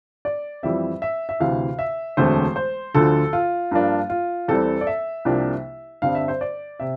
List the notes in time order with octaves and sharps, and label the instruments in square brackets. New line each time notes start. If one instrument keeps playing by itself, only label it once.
[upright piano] D5
F2 E3 G3 C4 E5
E5
E5
D2 C3 E3 F5
E5
E1 D2 D3 A3 C4 C5
C5
D2 D3 F3 A4
F4
G2 F3 A#3 D4
F4
E2 E3 G3 C4 A4
D5
E5
C2 C3 F3 A#3 D4
G2 D3 G3 C4 F5
E5
C5
D5
C3 E5